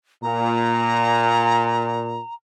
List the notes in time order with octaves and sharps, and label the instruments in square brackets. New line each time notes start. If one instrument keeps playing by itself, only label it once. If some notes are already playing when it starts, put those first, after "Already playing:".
[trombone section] A#2 [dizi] A#5